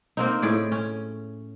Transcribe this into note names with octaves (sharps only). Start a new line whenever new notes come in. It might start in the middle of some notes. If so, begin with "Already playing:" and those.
A#3 C4 D#4
A2 G#4 D5
C#4